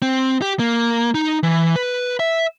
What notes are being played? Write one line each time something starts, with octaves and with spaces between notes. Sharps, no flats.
C4
G4
A#3
D#4
E3
B4
E5